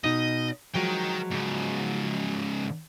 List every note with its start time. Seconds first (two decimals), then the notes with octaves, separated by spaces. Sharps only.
0.04 B2 D#4 D#5
0.75 F3 F#3 G#3 A#4 G5
1.31 G#2 C#3